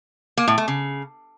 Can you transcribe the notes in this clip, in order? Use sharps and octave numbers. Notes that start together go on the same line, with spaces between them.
A#3
A2
A3
C#3